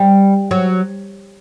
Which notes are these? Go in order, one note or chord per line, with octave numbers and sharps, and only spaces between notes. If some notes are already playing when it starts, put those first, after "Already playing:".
Already playing: G3
F#3